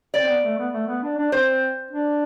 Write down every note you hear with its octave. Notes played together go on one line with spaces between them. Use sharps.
D5
C4
B3
A3
B3
A3
B3
D4
D4
C4 C5
D4